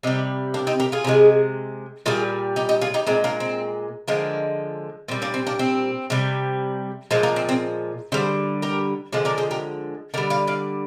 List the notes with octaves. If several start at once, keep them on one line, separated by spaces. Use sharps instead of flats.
C3 G3 D#4 G4
A#3 D4
C4 D#4
G4 A#4
F4 G#4
C3 F3 G#3
A#2 G3 F4 G#4
D#4 G4
D#4 G4
F4 G#4
D#4 G4
A#2 G#3 C4 D#4
A#3 D4
C4
D3 F3 G#3 A#3
A#2 G3 C4
A#3 D4
C4
A#3 D4
C4
C3 G3
A#2 F3 G#3 C4
A#3
C4
C4
D3 G3 G#4 C5
G4 A#4
D3 F3 G#3 D4 F4
A#4 D5
G#4 C5
G4 A#4
D3 G3 A#4 D5
D5 F5
D5 F5